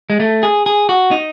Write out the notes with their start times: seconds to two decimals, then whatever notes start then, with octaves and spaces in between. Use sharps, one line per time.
0.10 G#3
0.20 A3
0.43 G#4
0.66 G#4
0.89 F#4
1.11 D#4